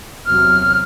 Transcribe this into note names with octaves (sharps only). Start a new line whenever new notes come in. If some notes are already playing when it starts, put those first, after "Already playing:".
E2 C3 F#3 F6